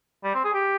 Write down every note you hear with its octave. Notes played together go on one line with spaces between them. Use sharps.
G3
C4
G#4
G4